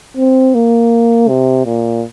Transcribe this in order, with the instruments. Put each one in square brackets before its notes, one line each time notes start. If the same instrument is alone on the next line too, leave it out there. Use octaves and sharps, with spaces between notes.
[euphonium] C4
A#3
C3
A#2